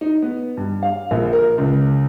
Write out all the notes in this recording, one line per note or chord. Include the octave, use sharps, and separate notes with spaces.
D#4
B3
G2
F5
A#1
A#4
C#2